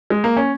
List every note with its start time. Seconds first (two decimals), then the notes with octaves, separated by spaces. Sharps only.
0.10 G#3
0.24 A#3
0.37 C#4